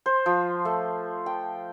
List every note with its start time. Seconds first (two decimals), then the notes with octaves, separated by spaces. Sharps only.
0.06 C5
0.26 F3
0.65 A3
1.26 G5